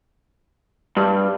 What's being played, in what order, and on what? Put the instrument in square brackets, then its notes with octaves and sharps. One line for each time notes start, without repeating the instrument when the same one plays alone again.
[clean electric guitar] G2